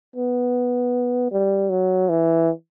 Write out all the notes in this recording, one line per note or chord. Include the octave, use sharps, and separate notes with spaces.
B3
G3
F#3
E3